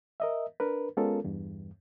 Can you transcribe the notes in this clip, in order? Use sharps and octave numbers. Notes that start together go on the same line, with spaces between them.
A#4 D#5 E5
D4 A#4 B4
G#3 B3 C#4 F4 A4 A#4
E2 G2